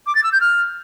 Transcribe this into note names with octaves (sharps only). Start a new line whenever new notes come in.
D6
A6
E6
G6
F6